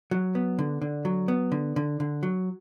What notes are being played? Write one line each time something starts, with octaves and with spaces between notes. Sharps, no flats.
F#3
B3
D3
D3
F#3
B3
D3
D3
D3
F#3